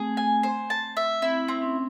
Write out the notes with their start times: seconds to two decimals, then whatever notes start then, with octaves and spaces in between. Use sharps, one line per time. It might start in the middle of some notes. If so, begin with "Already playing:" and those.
Already playing: A3 C4 G#4
0.17 G#5
0.43 C5
0.70 A5
0.97 E5
1.22 C4 E4
1.48 C4
1.62 C#4